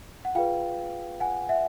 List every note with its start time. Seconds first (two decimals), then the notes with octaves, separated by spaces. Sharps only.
0.25 F#5
0.35 F4 G#4 B4 F5 G5
1.20 F#5 G#5
1.49 E5 F#5